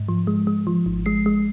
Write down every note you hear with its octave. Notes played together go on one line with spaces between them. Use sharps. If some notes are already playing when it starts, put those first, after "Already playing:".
Already playing: G#2
F3
G#3
G#3
F3
G#1
G#3 C7
G#3